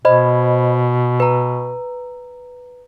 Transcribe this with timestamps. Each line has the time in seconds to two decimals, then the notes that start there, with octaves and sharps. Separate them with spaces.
0.05 B2 C5 D#5 B5
1.20 B4 A#5